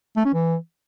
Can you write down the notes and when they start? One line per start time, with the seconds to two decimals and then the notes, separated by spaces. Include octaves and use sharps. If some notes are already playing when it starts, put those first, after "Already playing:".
0.16 A3
0.25 C#4
0.34 E3